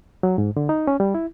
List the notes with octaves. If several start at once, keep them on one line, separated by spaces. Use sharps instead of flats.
F#3
G#2
D3
D#4
C#4
G3
E4